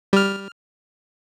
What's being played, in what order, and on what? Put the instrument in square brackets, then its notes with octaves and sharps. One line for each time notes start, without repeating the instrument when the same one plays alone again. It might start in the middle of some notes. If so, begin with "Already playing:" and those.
[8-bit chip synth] G3 F6